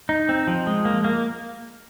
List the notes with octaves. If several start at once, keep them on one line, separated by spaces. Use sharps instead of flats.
D#4
C4
F3
G#3
A#3
A#3